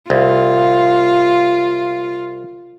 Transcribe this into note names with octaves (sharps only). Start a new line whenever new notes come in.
C2 F4 F5